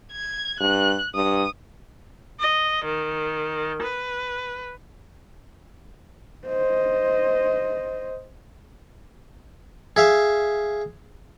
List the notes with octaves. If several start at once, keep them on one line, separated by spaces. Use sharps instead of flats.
G#6
G2 F#6
G2 D#6
D#5
D#3
B4
C5 D#5
G#4 E5 F5